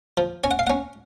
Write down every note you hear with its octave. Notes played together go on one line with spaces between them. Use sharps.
F3
C#4 G#5
F#5
F5
C#4 F#5